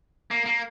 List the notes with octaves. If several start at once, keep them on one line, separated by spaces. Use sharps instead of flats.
A#3
A#3